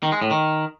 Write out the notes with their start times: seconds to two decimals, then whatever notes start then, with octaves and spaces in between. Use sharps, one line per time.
0.03 D#3
0.12 G#3
0.22 A2
0.31 D#3